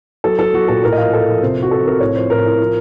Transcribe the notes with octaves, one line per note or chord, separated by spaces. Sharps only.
F#3 A4
F#3 A4
F#3 F#4
A#2 A4
A2 A#4
D#5
F3 F5
F3 A4
F3
C3 C5
C3
F#4
F3 A4
C3 A#4
A2 C#5
F3 C5
A2 A#4
A2
F3